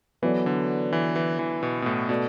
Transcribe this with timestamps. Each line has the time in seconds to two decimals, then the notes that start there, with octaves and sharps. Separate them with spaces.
0.22 E3 F#3 B3 F#4 A4 D5
0.46 D3
0.92 E3
1.16 E3
1.39 E3
1.63 B2
1.82 B2
1.86 A2
2.09 B2 A3 F#4 A4 D5